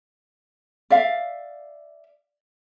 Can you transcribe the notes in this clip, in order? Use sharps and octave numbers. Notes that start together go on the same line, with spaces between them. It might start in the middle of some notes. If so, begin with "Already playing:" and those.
D5 E5 F5